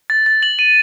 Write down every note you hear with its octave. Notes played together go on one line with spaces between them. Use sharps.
A6
A6
F#7
D#7